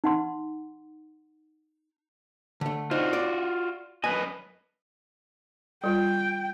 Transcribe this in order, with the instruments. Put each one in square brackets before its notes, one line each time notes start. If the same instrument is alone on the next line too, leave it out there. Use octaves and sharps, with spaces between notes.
[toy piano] D#4 F#5 C6
[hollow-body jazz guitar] D3 A3
[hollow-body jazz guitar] D4 D#4 C5 [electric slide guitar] F4 F#4
[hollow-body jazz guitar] D5
[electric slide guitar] F#2 B4 D#5 [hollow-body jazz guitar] G#5
[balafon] G3 F4 [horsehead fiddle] G5